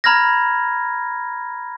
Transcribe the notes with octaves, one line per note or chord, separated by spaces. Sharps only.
A#5 B5 F6 G#6 A#6